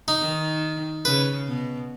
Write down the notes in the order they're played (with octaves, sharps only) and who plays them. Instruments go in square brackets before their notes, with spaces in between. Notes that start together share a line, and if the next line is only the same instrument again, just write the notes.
[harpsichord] D#4
[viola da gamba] D#3
[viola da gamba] C#3 [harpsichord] B4
[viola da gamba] B2